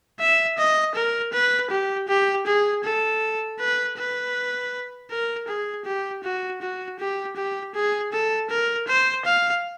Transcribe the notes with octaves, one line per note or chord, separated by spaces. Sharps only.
E5
D#5
A#4
B4
G4
G4
G#4
A4
B4
B4
A#4
G#4
G4
F#4
F#4
G4
G4
G#4
A4
A#4
C5
F5